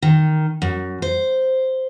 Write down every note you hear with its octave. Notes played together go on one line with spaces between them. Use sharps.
D#3
F#2
C5